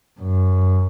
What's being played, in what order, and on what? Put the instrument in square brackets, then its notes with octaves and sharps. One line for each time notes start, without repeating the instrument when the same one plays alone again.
[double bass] F#2